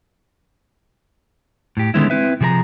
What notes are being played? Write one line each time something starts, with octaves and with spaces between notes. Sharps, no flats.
A2 G4
D3 D#3 G#3 B3 C#4 E4
C4 E4 B4 E5
C3 F3 G#4 A#4 A#5